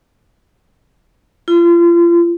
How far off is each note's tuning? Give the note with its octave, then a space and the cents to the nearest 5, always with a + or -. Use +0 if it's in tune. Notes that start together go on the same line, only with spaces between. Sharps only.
F4 -35